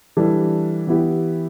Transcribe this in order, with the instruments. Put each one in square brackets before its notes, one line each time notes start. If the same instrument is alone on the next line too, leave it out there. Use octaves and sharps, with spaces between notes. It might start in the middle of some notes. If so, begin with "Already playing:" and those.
[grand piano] E3 G3 D4 A4
E3 B3 E4 G4